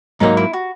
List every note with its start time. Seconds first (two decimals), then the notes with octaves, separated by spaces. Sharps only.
0.20 G#2 F#3 A#3 D#4
0.37 E4
0.53 F#4